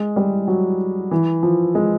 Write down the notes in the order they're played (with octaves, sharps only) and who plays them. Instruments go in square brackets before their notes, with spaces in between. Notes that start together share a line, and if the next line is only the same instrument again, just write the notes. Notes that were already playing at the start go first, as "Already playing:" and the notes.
Already playing: [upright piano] G#3
G3
F#3
E3
F3
G#3